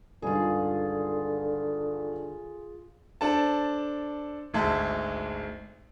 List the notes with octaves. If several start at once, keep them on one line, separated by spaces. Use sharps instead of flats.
C#2 G2 D3 D#3 F4 G#4
D4 A4 C5 A5
G#1 D2 G#3 E5 A5